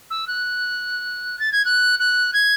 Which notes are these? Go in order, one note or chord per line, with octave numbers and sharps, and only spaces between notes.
E6
F#6
A6
G#6
F#6
F#6
G#6